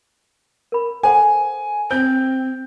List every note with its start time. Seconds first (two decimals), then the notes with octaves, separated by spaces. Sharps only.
0.72 A#4 B5
1.03 A4 C5 F#5 G#5
1.91 C4 C5 G6